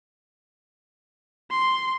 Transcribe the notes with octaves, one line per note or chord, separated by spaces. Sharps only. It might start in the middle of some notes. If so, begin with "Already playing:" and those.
C6